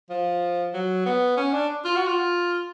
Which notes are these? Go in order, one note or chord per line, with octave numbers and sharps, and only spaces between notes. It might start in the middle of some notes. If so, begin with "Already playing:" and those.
F3
F#3
B3
C#4
D4
F4
F#4
F4